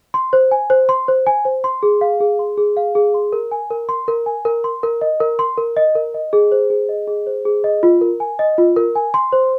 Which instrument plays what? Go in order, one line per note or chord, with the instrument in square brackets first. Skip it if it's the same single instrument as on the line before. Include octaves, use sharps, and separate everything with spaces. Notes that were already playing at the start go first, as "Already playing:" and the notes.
[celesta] C6
C5
G#5
C5
C6
C5
G#5
C5
C6
G#4
F5
G#4
C6
G#4
F5
G#4
C6
A#4
G#5
A#4
C6
A#4
G#5
A#4
C6
A#4
D#5
A#4
C6
A#4
D#5
A#4
D#5
G#4
C5
G#4
D#5
G#4
C5
G#4
D#5
F4
A#4
G#5
D#5
F4
A#4
G#5
C6
C5